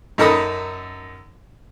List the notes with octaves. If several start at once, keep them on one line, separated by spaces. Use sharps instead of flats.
F#2 D#4 A4 A#4 B5 D#6